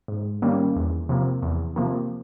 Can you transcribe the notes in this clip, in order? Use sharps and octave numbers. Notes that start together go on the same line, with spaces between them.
G#2
D#3 G3 A#3 C#4
E2
C3 F3 A#3
E2
C3 F3 A#3